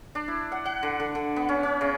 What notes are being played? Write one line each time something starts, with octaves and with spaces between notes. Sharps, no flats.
D4
E4
F#5
F#5
D3
D3
D3
B3
C#4
C#4
C#3